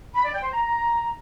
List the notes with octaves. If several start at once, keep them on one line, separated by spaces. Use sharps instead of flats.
B5
D5
G5
C5
A#5